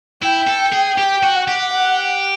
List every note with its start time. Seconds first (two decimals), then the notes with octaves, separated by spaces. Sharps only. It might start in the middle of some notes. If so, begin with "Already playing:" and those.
0.22 E4 G5
0.47 A4
0.73 G#4
0.98 G4 G5
1.23 F#4
1.36 F#5
1.48 G4
1.72 F#5